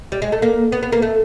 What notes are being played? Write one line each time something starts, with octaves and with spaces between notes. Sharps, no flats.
G3
G#3
A3
A#3
B3
B3
A#3
A3